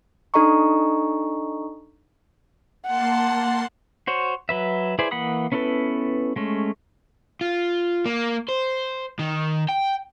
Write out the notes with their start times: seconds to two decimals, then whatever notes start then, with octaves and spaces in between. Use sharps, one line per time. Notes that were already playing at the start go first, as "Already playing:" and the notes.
0.34 D4 D#4 A4 D#5 A#5 C#6
2.86 A#3 F#5 A5 C6
4.07 F#4 C5 C#5
4.49 F#3 B4 E5
4.99 E4 G#4 B4 C5 D5
5.11 E3 A#3 F#5 B5 D#6
5.52 B3 C#4 E4 A4 B4
6.36 G#3 A3 C#4
7.41 F4
8.05 A#3
8.48 C5
9.19 D#3
9.69 G5